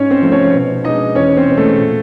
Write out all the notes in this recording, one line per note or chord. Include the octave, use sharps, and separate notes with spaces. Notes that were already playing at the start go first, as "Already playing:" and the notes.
Already playing: G#2 C#4 C#5
C4 C5
F3 A3
C#4 C#5
B2
G#3 B3 D4 D#4 D#5
E2 C#4 C#5
C4 C5
B2 G#3
A3 A4
A#2